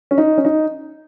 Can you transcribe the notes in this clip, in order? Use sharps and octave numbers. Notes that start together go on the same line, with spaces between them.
C#4
D#4
C#4
D#4